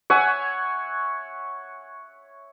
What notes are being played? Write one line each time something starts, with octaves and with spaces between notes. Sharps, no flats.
C#5 E5 F#5 G#5